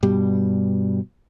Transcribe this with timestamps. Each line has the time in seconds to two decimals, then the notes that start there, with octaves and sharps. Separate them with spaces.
0.03 G2 B2 G3